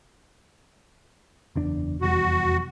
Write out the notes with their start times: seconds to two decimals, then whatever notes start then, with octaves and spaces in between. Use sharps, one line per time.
1.56 F#1 E2 D4
2.01 F1 E2 G3 F#4